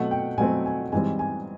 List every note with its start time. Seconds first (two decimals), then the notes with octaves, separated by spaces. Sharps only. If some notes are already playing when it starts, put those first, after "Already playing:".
Already playing: B2 F#3 A3 C4 F#5
0.11 G5
0.38 B2 F#3 A3 C4 G#5
0.66 G#5
0.92 G#2 E3 G3 C4 G#5
1.19 G#5